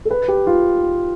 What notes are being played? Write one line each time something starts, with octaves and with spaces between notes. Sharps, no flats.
A4
B4
G4
F4